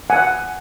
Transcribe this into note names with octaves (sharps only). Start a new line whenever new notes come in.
F#5 G#5